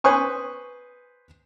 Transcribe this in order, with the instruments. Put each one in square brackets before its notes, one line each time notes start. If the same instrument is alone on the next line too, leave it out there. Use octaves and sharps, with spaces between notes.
[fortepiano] B4 C5 G#5 C#6 D#6